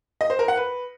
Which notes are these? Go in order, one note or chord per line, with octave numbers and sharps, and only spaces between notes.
D#5
C5
A#4
F#5
B4